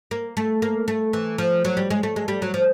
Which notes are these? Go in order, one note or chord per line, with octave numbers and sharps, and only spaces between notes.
A#3
A3
A#3
A3
E3
F3
F#3
G3
G#3
A3
G#3
G3
F#3
F3